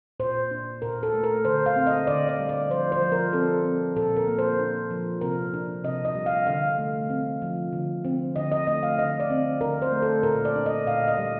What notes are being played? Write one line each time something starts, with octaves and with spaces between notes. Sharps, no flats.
A#2 C5
D4
A#2 A#4
A4
A3
A#4
D3 C5
F5
C4
D#5
D3 D5
D5
G3
D5
F3 C5
C5
F3
A#4
C4 A4
C4
A#2 A4
A#4
A#3
C5
D4
F3
C3 A#4
D4
C3 D#5
D#5
G3
F5
D3 F5
A3
C4
F3
D3
C4
D3 D#5
D#5
A3 D#5
F5
D3 D#5
D5
C4
D3 A#4
C5
A3
A4
A#2 A#4
D5
D4
D#5
A#2 F5
D#5
G3